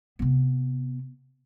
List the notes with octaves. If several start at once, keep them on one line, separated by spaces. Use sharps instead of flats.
C3 B3